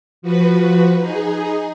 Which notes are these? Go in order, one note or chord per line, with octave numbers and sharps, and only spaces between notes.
F3 F#4 B4
D#4 G#4